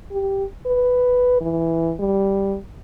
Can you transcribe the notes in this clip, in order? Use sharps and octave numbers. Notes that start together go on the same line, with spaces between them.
G4
B4
E3
G3